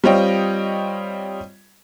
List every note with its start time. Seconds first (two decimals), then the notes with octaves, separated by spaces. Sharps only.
0.04 G3 C4 F4 C#5 D#5 G5